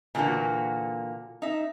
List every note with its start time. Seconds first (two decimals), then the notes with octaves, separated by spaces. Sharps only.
0.15 A#2 D3 E3 A3 A#3 F#4
1.42 D#4 E5